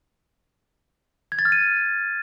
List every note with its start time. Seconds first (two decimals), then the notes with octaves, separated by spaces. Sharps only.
1.32 G#6
1.39 A6
1.45 F6
1.52 D#7